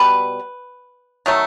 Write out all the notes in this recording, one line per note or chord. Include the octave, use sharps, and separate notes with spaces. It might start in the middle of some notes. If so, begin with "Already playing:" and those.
Already playing: B2 G3 B3 B4
D#3 F#3 A3